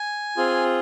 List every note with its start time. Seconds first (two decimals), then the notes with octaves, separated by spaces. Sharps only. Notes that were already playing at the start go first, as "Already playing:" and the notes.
Already playing: G#5
0.37 C4 F4 G#4